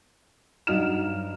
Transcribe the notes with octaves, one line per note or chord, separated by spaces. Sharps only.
G2 F#3 D#4 F6 E7